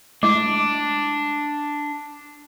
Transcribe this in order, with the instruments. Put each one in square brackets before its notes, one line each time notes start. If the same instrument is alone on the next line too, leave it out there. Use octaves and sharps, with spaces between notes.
[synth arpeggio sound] G#3 A3 E4 [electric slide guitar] D4 [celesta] D6